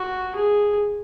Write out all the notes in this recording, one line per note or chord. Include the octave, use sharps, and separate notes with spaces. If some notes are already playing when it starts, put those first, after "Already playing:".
Already playing: F#4
G#4